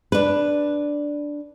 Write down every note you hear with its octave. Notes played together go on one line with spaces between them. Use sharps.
D4 B4